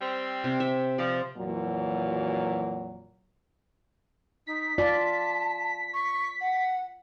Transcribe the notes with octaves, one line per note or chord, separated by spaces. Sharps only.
G3 C4
C3
E5
F3 D5
F2 A#2 E3 F#3
D#4 B6
F4 D5 A5
C#6
F#5